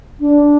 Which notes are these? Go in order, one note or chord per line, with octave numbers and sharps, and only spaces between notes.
D4